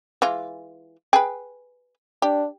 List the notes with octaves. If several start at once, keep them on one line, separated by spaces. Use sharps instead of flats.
E3 G#3 F4
G#4 B4 G5
D4 G4